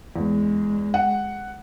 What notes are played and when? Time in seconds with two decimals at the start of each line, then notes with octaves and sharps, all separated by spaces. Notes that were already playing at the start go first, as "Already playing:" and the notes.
0.16 E2 G#3
0.94 F#5